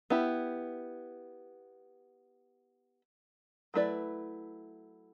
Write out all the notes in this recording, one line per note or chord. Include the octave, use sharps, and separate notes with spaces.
B3 E4 G4
F#3 A3 E4 B4 D5